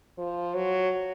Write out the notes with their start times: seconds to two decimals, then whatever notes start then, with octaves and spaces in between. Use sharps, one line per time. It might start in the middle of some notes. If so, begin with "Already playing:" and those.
0.18 F3
0.55 F#3